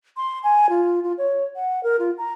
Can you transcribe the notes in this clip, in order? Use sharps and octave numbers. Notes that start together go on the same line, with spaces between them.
C6
G#5
F4
F4
C#5
F#5
A#4
F4
A#5